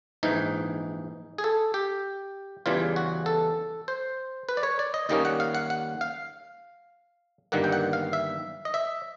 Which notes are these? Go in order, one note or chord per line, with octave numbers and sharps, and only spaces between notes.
A#1 G#2 E3 D#4
G#4
A4
G4
E2 C#3 E3 G3 F4
F#4
A4
C5
B4
D5
C#5
D5
D#5
D#2 D#3 G3 A#3 C#4 D#5
F#5
F5
F#5
F#5
F5
G1 G2 D#3 G3 A#3 F#5
G5
F#5
F5
E5
D#5
E5